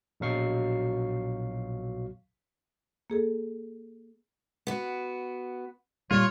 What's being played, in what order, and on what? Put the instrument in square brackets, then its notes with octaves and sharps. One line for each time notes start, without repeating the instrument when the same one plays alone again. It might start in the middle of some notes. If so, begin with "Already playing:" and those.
[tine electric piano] A#1 B2 F#3 F5 C#6 C7
[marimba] A#3 G#4 A4
[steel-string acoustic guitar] B3 F#4
[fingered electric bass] A#2 G3 [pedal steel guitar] F4 [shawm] C#5